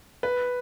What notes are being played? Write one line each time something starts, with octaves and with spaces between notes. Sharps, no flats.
B4